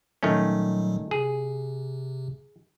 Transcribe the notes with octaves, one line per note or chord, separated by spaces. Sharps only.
A#2 D#3 F#3 G3 A3 C#4
C3 G#4